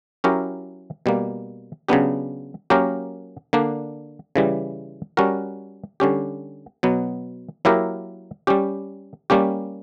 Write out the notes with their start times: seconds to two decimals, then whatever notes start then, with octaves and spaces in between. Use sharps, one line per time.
0.24 F#3 C#4 E4 G4 A#4
1.06 B2 G3 A#3
1.89 C#3 F#3 B3 D4 G4
2.70 F#3 A#3 C#4 G4 A#4
3.53 D3 A#3 D4
4.36 C#3 E3 G3
5.17 G3 C#4 F#4 A#4
6.00 D3 G3 C#4 G4
6.83 B2 F#3 B3
7.65 F#3 A#3 E4 G4 A#4
8.47 G3 C#4 G4
9.30 G3 A#3 C#4 G4